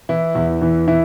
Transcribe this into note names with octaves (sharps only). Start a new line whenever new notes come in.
E3 E4
E2
E3
E3 E4